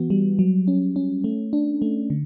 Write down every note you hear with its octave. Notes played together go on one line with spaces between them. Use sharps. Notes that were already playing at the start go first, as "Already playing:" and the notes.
Already playing: E3 B3 F#4
G3
F#3
C#4
C#4
A3
D4
A3
D3